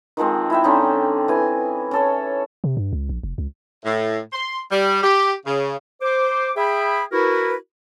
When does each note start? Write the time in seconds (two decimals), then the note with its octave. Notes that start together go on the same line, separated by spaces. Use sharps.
0.17 D#3 F3 G#3 C4
0.50 E4 E5 G5
0.64 D3 C4 C#4 D#4
1.28 E3 G#5
1.91 C#4 A4 C#5
2.64 C3
2.77 G2
2.93 C#2
3.09 A#1
3.23 F1
3.38 C#2
3.85 A2
4.33 C6
4.71 G3
5.03 G4
5.46 C#3
6.02 C5 D6
6.56 G#4 E5 G5 B5
7.12 E4 F#4 A#4 B4